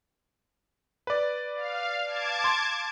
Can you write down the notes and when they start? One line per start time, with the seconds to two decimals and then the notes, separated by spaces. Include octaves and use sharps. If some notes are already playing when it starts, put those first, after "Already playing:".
1.07 B4 D5
1.55 F5
2.06 A5 D6 G#6
2.44 C6